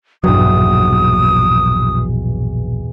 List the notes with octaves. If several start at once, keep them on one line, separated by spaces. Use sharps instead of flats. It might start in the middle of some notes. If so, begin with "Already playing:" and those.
A#1 E2 G2 B2 F#3 D#6